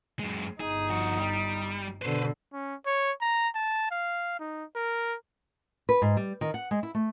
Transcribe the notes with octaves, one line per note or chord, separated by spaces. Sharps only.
F#2 G#3
G1 D#4 G#4
F3 F#4
G3
B2 D3 B4 C5
C#4
C#5
A#5
A5
F5
D#4
A#4
B4
G#2
G3
D#3
F#5
G#3
E4
A3